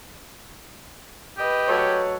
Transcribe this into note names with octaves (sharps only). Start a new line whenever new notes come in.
G4 B4 D#5
F#3 A3 C#5